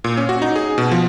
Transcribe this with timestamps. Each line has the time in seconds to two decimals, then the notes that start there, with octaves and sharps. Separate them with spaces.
0.04 A#2
0.17 C#4
0.29 F#4
0.42 D#4
0.56 G#4
0.78 B2
0.91 F3